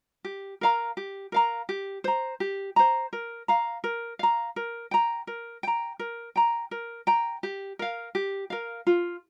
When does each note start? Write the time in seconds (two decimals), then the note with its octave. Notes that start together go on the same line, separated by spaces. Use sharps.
0.25 G4
0.61 A#4 F5 A#5
0.97 G4
1.32 A#4 F5 A#5
1.69 G4
2.04 C5 A#5
2.40 G4
2.76 C5 A#5
3.13 A#4
3.48 F5 A#5
3.84 A#4
4.19 F5 A#5
4.56 A#4
4.91 G5 A#5
5.27 A#4
5.63 G5 A#5
5.99 A#4
6.36 G5 A#5
6.71 A#4
7.07 G5 A#5
7.43 G4
7.79 A#4 F5
8.15 G4
8.50 A#4 F5
8.87 F4